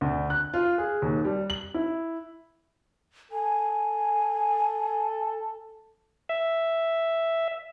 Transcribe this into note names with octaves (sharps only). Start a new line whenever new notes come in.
D2
F#6
F4
G#4
D#2
G3
F#7
E4
A4 G#5
E5